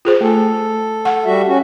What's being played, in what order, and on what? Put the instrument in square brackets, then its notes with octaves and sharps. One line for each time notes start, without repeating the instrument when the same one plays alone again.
[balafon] F4 G#4 C5
[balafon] A3 G#5 [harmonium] A4
[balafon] F#5
[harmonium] G3 F#4 E5
C#4 F#4